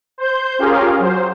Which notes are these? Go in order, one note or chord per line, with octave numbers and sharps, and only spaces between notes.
C5 G6
C#4 F4 G4 G#4 A#4 F5
F#3 C5